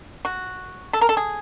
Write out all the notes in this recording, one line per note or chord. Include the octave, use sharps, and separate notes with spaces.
F#4
A4
A#4
A4
G#4